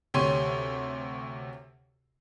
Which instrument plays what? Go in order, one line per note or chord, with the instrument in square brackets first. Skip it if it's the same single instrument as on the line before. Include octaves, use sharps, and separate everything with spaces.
[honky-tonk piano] D2 C3 G4 C#5 C6 D#7